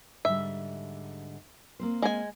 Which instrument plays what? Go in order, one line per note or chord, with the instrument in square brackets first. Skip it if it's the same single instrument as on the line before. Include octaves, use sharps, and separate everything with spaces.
[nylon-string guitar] G#2 D3 G3 [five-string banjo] E5
[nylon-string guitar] A#3 C4 C5
[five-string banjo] G#3 G#5